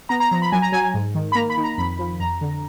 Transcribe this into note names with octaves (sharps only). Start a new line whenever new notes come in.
B3 A#5
A#5
F3 A#5
B5
F#3 G#5
A#5
F#3 G#5
G#2
D#3
B5
A#3 A#5
B5
D#3
A#5
F2 B5
F3
F2 A#5
D3